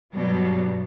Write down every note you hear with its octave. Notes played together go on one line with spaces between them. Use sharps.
G2 B2 F#3 G3